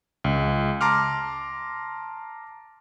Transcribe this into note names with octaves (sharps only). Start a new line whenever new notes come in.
C#2
A5 A#5 C6 D6 F6